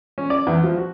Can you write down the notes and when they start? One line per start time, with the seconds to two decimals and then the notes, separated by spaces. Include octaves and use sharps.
0.18 C#4
0.30 D5
0.47 E2
0.64 F3
0.77 F#4